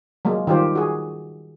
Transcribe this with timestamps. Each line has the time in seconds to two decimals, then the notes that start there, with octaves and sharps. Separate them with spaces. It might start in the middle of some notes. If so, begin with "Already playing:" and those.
0.25 F#3 G#3 A#3
0.47 D#3 G3 F4 G4 C5
0.75 F#4 G#4